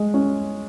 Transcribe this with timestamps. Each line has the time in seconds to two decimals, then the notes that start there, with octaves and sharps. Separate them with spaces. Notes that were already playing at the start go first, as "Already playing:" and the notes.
Already playing: G#3
0.14 C#4